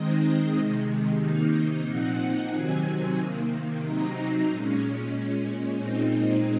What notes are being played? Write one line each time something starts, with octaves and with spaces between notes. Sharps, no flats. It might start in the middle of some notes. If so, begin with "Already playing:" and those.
Already playing: D#3 G#3 C4 D#4 D#5
C3 D#3 G#3
C3 D#3 A#3 D#4
A#2 F3 C4 D#4 F#5
C3 D#3 F#3 C4 G#5
C3 D#3 A#3
C3 F#3 C4 D#4 A#5
A#2 G#3 C#4
A#2 G#3 C#4
A#2 G#3 C4 D#4